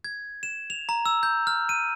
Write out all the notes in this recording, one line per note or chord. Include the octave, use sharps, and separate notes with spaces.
G#6
E7
F7
A#5
E6
G6
F6
D#7